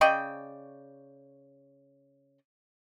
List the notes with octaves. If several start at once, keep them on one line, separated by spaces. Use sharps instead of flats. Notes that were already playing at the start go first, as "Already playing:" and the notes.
C#3 D5 D#5 G5